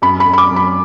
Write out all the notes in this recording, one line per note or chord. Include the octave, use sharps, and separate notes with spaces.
F#2 B5
B5
F#2
B5
D6
F#2
B5